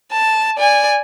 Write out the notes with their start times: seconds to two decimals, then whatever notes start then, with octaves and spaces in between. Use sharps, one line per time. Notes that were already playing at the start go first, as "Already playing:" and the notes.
0.12 A5
0.58 D5 G#5